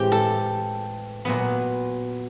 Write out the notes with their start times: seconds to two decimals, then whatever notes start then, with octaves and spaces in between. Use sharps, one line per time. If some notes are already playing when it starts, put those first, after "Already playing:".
Already playing: A2 E3 G#3 C4 G4
0.12 A4
1.25 A#2 F#3 B3